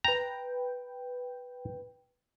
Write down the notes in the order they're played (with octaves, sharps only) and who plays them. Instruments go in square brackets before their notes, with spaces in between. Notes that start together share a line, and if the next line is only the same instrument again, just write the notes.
[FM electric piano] B4 G5 [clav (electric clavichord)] A#5